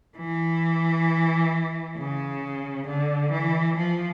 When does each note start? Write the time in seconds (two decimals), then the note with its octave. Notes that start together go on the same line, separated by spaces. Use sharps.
0.17 E3
1.97 C#3
2.86 D3
3.31 E3
3.76 F3